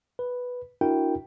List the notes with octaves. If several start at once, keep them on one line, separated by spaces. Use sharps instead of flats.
B4
D4 E4 F#4 A#4 G5